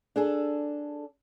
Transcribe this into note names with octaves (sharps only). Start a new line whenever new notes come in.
D4 G#4 A4